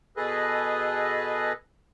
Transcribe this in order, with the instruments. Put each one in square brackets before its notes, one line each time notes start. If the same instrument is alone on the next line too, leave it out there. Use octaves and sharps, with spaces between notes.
[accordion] B2 G#4 A4 B4 D#5